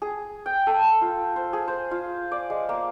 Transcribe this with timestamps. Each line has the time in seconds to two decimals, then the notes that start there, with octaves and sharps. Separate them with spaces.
0.02 G#4
0.46 G5
0.67 A4
1.01 F4
1.36 C5
1.53 G#4
1.68 C5
1.91 F4
2.32 D5
2.50 G#3
2.69 A#3